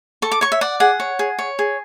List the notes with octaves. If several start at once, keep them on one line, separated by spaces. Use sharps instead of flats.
A4 C#6
D6
C#5 C#6
E5
D5 F#5
G#4 F#5
C#5
G#4
C#5
G#4